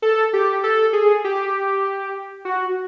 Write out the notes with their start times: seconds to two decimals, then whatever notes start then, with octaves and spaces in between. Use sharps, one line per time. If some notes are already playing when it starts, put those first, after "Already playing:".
0.02 A4
0.33 G4
0.64 A4
0.93 G#4
1.24 G4
2.45 F#4